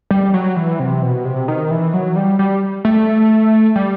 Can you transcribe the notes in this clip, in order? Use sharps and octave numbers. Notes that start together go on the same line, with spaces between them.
G3
F#3
E3
C3
B2
C3
D#3
E3
F#3
G3
G3
A3
G3